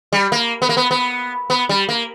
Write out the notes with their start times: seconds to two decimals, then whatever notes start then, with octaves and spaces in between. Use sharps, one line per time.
0.13 G3
0.32 A#3
0.62 B3
0.69 A#3
0.77 B3
0.91 B3
1.50 B3
1.69 G3
1.89 A#3